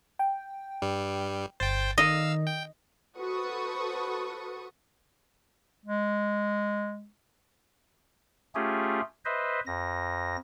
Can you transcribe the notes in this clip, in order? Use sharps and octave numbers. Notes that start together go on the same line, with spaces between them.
G5
G2 G3
G1 C5 G5 A6
D#3 D#4 D#5 F5 E6
G5
F#4 A4 B4 C5 C#6 D#6
G#3
A3 C#4 F4 G4 G#4
B4 C5 D#5 E5
F2 A#6